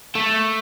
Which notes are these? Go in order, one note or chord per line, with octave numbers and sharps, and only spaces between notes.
A3